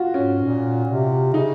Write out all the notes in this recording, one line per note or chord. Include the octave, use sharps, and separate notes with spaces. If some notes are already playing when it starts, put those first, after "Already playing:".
Already playing: F4 F#4
G#2 C#4
A#2
C3
C#3 D#4